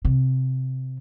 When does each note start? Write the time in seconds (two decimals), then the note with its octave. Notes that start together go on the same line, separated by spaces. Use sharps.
0.05 C3